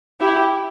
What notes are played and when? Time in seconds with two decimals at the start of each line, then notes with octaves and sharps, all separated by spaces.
0.20 E4 G4